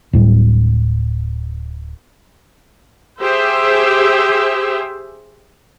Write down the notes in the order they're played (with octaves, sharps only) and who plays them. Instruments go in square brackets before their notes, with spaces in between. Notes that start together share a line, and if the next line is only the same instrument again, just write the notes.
[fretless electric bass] D1 A2 G3
[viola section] G4 G#4 C5 E5